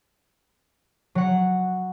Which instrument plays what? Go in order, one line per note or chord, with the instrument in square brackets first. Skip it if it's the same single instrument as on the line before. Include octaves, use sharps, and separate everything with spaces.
[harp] F#3 F#5